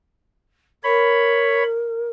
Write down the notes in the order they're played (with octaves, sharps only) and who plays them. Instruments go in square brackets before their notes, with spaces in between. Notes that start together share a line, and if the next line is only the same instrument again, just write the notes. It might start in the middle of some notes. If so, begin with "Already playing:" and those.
[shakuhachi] A#4 [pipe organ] C#5 B5